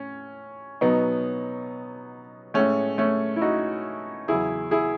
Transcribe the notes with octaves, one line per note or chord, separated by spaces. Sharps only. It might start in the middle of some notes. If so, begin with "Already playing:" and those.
Already playing: A2 C#4
B2 F#3 B3 D#4
A2 G#3 A3 C#4
A3 C#4
E4
D#4 F#4
E2 C#3 F#3 E4 G#4
E4 G#4